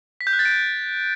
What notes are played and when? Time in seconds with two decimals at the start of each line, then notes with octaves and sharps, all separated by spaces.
0.21 B6
0.27 G6
0.33 F#6
0.39 A6
0.45 D7